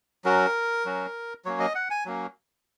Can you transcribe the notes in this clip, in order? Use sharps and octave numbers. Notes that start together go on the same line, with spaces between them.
F#3 C#4 F#4 A#4
F#3 C#4 F#4
F#3 A#3 C#4 C#5
D#5
F#5
G#5
F#3 A#3 C#4